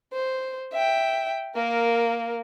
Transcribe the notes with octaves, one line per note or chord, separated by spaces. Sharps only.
C5
E5 G5
A#3 A#4